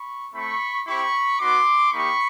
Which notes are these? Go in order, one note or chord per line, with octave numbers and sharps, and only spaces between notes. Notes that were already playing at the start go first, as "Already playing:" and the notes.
Already playing: B5 C#6
A3 C4 E4 B5 C#6
C4 E4 G4 B5 C#6
B3 D#4 F#4 C6 D6
A#3 D#4 G4 B5 C#6